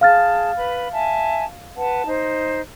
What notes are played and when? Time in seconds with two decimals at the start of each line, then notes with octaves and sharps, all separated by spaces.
0.01 G#4 F5 A5 F6 A6
0.58 B4 B5
0.93 E5 G#5 A5
1.77 B4 F#5 A5
2.07 D#4 C5